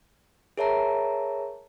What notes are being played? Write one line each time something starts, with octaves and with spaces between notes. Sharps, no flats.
G#4 A#4 C#5 E5 A5 A#5